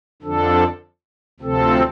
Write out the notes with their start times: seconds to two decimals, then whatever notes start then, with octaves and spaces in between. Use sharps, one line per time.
0.22 F2 D3 F3 D4 A4
1.40 D2 C3 F3 C4 A4